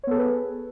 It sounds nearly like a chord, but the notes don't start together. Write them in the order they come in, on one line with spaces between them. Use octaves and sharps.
C#5 B3 A4 G#4 B4